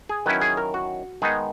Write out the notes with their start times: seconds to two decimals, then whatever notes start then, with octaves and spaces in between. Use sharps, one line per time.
0.09 G#4
0.26 D#3 F#3 C#4 E4 B4
0.41 G#4
0.57 A#4
0.74 F#4
1.22 D#3 G#3 B3 D#4 G#4